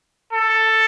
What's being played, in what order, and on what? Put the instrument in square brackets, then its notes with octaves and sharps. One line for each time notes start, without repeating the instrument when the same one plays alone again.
[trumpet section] A4